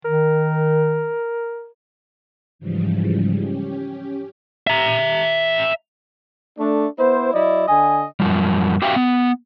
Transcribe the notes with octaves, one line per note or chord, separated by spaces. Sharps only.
D#3 A#4
G#2 C#3 E3 F3 G3
C#4 G4
E5 A#5
A3 D4
B3 E4 C5
F#3 E4 D5 D#5
D3 D#5 G#5
F#2 F3 G3
F#4 G4 E5 F5 G5
B3